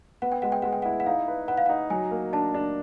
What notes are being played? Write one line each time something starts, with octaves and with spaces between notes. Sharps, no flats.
B3 F#5
G5
G#3 F#5
G5
G#3 F#5
G5
E4 F#5
F#5
D#4 F5
B4
B4 F#5
F5
D#4 F#5
F#3 G#5
A#3
D4 A5
D4